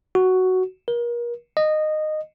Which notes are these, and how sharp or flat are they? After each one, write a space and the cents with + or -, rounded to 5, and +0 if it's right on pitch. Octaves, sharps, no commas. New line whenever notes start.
F#4 +5
A#4 +35
D#5 -15